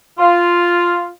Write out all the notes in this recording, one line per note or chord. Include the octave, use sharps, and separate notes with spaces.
F4